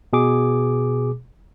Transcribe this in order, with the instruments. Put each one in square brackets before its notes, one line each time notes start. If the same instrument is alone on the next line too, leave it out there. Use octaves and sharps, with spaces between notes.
[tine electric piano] B2 G#4 D6